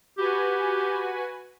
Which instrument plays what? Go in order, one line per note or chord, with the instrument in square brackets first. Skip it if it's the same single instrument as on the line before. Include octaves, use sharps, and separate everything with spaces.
[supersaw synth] F#4 B4 G#5 [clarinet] G4